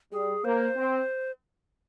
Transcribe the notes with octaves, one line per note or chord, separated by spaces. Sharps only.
G3 G#4
A#3 C5
C4